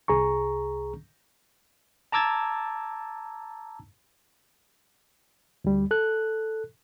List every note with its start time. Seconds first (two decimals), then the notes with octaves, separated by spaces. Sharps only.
0.08 C2 G#4 A#5 C#6
2.12 A5 A#5 D6 E6 G#6 A6
5.64 D2 G3
5.91 A4 F#6